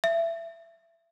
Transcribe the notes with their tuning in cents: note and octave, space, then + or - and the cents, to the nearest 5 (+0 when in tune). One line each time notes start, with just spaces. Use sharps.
E5 +20